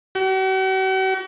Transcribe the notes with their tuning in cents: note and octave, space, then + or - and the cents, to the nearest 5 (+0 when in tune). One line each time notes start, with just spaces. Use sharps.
F#4 +45